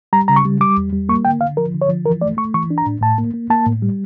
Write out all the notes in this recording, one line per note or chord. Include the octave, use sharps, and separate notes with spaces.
G3 A#5
C#3 A#5
C#6
G3
G3 D6
E2
G3
A#3 C#6
D3 G5
D3 F5
F3 A#4
D3
C#5
F3
E3 A#4
A3 D5
A3 C#6
E3 C#6
D4
A#5
A2
A2 A5
A#3
A#3
A#3 A5
A2
G3